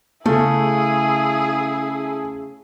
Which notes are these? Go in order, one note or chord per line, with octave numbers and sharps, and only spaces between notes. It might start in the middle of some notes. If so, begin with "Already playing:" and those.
C#3 A3 E4 G#4